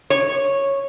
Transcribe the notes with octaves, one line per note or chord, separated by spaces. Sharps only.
C#5